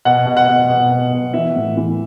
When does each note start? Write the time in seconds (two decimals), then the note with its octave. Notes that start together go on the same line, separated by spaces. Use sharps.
0.05 B2 F#5
0.26 B2
0.37 F#5
0.48 B2
0.69 B2
0.91 B2
1.13 B2
1.34 E3 E5
1.56 A2
1.77 E3